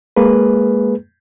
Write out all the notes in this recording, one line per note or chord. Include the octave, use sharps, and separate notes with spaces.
G#3 A#3 G#4 B4